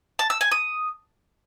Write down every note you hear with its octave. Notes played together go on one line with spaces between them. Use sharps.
A5
E6
G#5
D#6